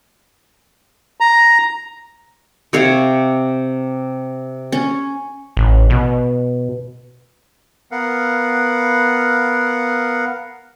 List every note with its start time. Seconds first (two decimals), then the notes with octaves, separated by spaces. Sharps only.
1.20 A#5
2.73 C3 C#5 F5
4.72 C#4
5.57 A1
5.90 B2
7.91 B3 A#4 F5 F#5